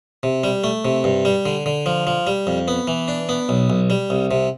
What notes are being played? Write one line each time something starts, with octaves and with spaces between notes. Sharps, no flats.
C3
G3
A3
C3
G2
G3
D3
D3
F3
F3
G3
F2
B3
E3
D4
B3
B1
B1
G3
C2
C3